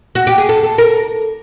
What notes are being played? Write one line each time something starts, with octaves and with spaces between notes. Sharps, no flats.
F#4
G4
G#4
A4
A4
A#4